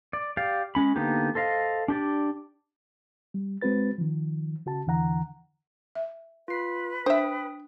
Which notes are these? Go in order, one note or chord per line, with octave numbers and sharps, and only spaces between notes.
D5
G4 D5 F5
G#3 C#4 B5
D3 A#3 B3 D#4 G4
A4 C5 D#5 F5
D4 G4 D5
G3
G#3 C4 F#4 B4 A6
D#3 F3
C#3 F#4 A5
E2 D3 E3 F#5 A#5
E5
F4 B4 C7
D4 C5 E5 G5 D#6